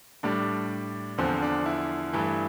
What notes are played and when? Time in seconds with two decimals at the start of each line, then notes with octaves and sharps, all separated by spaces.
0.23 A2 G3 D4
1.18 E2 D3 F3 C4
1.42 D4
1.66 E4
2.13 G2 E3 A3